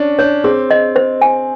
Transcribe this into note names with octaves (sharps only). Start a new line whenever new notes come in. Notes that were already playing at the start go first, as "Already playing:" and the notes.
Already playing: C#4 D4
D4 C#5
C4 G#4
D#5
C5
G#5